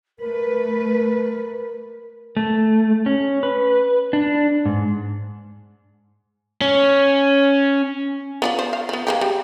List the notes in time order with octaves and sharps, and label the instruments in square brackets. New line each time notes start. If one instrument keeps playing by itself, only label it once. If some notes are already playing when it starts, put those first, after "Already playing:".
[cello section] A3 B4 [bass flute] A#4
[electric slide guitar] A3
C#4
B4
D4
G#2
[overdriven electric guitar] C#4
[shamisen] B3 F4 D5
C5
F5
F3 B3
G#3 A#3 G4
G3